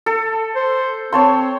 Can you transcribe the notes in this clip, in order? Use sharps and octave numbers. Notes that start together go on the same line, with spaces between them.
A4
C5
C4 C#5 A5 C6